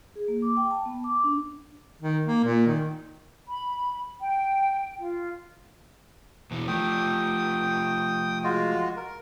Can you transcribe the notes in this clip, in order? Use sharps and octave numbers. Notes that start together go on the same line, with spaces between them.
G#4
A#3
D6
G5
A5
B3
D6
D4
D#3
A#3
A#2
D#3
B5
G5
F4
E2 B2 E3
F3 A3 G5 D#6
G#3 F4 F#4
A#4